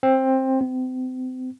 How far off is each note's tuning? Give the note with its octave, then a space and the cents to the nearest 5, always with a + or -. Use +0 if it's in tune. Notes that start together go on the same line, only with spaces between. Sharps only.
C4 +15
C4 -35